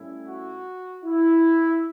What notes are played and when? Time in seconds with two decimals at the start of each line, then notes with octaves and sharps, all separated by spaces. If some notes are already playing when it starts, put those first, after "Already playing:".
Already playing: A2 G3 C#4 E4
0.27 F#4
1.05 E4